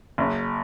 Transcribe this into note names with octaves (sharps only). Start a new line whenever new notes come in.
F#1